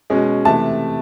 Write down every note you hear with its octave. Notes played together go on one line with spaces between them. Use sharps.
B2 G#3 C#4
C3 E3 A3 A5